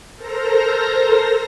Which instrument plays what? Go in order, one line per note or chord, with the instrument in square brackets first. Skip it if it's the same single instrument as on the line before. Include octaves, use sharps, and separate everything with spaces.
[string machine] A4 A#4 C5 A#5 A#6